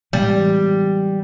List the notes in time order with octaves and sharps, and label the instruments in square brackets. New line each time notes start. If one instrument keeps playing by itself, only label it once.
[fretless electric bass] A2 E3 G#3 B3 [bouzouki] G3